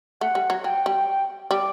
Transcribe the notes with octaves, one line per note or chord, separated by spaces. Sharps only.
A3 F#5
G3
F#3
F#3 G5
G3
G3 D6